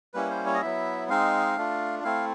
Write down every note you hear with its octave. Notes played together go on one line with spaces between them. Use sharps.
G3 A#3 C#4 E4 B4
C5
C#5
D#5
F#3 B3 E4 E5
G#3 C4 D#4 F5
A3 D4 F4
A3 C4 E4 F5